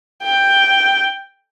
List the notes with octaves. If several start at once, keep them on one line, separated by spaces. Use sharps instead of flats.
G5